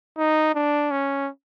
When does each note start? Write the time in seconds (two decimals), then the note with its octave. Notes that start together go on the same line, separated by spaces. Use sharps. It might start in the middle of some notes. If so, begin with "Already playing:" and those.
0.18 D#4
0.55 D4
0.91 C#4